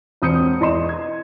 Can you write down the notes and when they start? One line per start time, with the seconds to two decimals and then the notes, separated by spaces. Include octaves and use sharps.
0.22 E1 C4 D#6 G6 C#7
0.61 E2 D#5 C6 E7
0.89 G#6